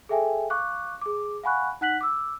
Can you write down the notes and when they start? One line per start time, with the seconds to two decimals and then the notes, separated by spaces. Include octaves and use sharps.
0.09 G#4 A4 E5 G5 G#5
0.50 F5 C#6 D6 F#6
1.01 G#4 D6
1.44 F5 F#5 G#5 B5 C#6 F#6
1.81 D#4 F#5 F#6 B6 F#7
2.01 D6 E6